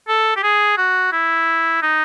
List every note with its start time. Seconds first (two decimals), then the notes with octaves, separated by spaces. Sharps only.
0.08 A4
0.36 G4
0.43 G#4
0.77 F#4
1.12 E4
1.82 D#4